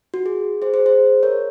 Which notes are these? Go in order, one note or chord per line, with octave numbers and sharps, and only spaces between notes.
F#4
G#4
G#4 C5
G#4 C5
G#4 C5
A#4 C#5